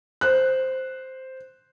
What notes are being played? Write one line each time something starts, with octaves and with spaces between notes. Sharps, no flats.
C5 F#6